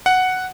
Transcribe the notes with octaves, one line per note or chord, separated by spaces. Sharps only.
F#5